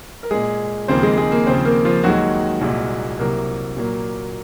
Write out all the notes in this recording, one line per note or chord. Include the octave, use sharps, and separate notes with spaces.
A#4
A#2 G#3 G#4
D#2 C#3 F3 A#3 C4 C5
G#3 G#4
G#3 G#4
A#3 A#4
D#2 C#3 F3 C4 C5
A#3 A#4
F3 F4
D#2 D#3 F#3 G#3 F#4
C2 A#2 G#3
C2 C3 F#3 A#3 A#4
A#2 F#3 A#3